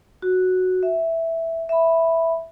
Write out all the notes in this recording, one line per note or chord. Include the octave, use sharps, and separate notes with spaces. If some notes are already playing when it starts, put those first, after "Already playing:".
F#4
E5
E5 B5